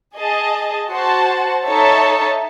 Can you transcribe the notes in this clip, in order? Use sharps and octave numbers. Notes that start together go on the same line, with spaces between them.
G#4 D#5 A5
F#4 C5 F#5 A5
D#4 A4 C#5 E5 A5